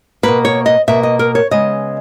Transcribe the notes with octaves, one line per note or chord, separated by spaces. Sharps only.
B2 A#3 B4
C#5
D#5
B2 A#3 E5
D#5
A#4
C#5
C#3 G#3 B3 D#5